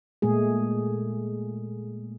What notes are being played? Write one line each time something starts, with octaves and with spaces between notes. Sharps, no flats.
A#2 G#3 A3 G#4